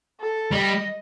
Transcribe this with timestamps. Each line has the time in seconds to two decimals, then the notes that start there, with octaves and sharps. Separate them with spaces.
0.21 A4
0.53 G3 D#5